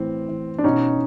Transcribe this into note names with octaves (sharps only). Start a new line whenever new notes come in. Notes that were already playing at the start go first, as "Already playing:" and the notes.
Already playing: A2 E3 C4
E3
D4
B2 C#4 D#4